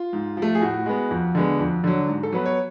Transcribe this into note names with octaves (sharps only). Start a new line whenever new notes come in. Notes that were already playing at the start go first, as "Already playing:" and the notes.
Already playing: F4
G#2
F3
A3
G#4
A2 F#4
G#3 B3
F2
D3 G#3 B3
F2
D3 F#3
G#2
A4
F#3 B3 B4
C#5